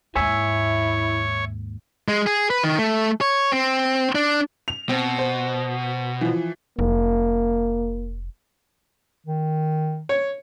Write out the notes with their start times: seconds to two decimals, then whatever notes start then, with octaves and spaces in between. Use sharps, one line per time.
0.16 D#2 G#2 E4 C#5 E5 G#5
2.08 G#3
2.27 G#4
2.50 B4
2.63 D#3
2.79 A3
3.21 C#5
3.52 C4
4.15 D4
4.68 F7
4.89 B2 C4
5.18 C5
6.21 E3 F3
6.79 F1 A#3
9.27 D#3
10.09 C#5